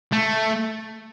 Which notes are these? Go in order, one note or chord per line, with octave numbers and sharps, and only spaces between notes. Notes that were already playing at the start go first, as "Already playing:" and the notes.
A3